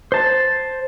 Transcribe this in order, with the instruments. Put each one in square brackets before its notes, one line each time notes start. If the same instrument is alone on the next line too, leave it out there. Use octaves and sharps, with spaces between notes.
[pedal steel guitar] C5 A5